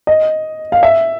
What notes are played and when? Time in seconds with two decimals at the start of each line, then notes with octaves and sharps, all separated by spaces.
0.07 D#5
0.72 F5
0.83 E5